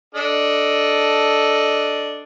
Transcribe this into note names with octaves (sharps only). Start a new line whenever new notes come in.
D4 A4 D#5